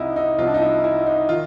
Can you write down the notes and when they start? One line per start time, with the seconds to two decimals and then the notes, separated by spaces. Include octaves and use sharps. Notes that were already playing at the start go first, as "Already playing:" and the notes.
Already playing: C2 C3 F3 D#4 E4
0.16 D#4
0.38 C2 C3 F3 F4
0.47 D4
0.54 D#4
0.62 E4
0.84 E4
1.06 D#4
1.29 D#3 F4